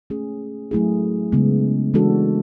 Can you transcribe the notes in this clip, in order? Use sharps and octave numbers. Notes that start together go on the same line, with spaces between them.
A3 C#4 G#4
F#3 A3 E4 G#4
C#3 G#3 B3
E3 G#3 D4 F#4 A4